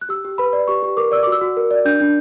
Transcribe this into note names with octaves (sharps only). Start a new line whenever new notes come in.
F#6
G4 E6
G4
B4 B5
D5
G4 C#6
G4
A#4 D6
D5 E6
F#4 D6
E6
F#4
A#4
D5
D4 G6
D4